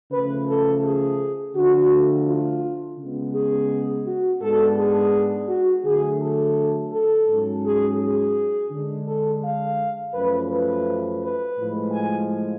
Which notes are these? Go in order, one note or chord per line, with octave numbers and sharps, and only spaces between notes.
C#3 F3 A3 B4
A4
G#4
D3 F3 A3 D4 F#4
F4
C#3 G#3 B3
G#4
F#4
G#2 G#3 B3 D4 A4
G#4
F#4
D3 F#3 A3 G#4
A4
A4
G#2 F#3 C#4
G#4
G#4
D3 G#3 D4
A4
F5
F#2 F3 A3 C#4 B4
B4
B4
A2 F3 G#3
G#5